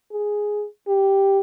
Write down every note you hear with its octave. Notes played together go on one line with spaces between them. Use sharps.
G#4
G4